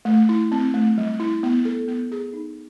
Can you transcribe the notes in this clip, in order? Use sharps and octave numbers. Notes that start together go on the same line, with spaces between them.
A3
E4
C4
A3
G3
E4
B3
A4
B3
G#4
D#4